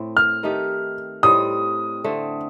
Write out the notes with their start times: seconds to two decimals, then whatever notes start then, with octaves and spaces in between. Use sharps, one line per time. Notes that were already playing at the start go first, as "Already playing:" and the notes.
Already playing: A2 A3 C4
0.17 F6
0.43 D#3 A3 D#4 G4
1.23 A2 G3 C4 D#4 D#6
2.04 D3 A3 C4